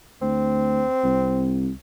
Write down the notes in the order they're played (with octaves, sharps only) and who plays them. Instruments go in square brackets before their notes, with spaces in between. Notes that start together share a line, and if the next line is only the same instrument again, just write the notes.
[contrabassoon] D2 [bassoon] C4
[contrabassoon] C2